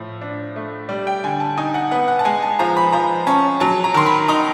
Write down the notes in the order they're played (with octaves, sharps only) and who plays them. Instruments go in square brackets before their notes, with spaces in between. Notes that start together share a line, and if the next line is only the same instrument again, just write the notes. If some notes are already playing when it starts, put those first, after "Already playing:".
Already playing: [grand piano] A2 F3
D4
A3
G3 D5
G5
D3 G#5
A5
D#4 G#5
F#5
B3 F#5
F#5
A5
G#3 G#5
A5
F3 A#5
B5
F3 A#5
C#4 A5
F#3 A5
A#5
D#3 C6
B5
D#4 A#5